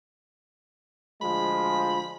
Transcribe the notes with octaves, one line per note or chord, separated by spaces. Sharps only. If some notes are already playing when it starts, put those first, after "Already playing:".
D2 F3 G#3 B5